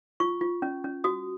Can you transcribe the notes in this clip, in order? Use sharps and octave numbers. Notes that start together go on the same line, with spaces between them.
F4 C#6
F4
C#4
C#4
F#4 D#6